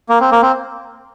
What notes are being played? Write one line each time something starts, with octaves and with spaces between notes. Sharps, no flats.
A#3
C4
A#3
C4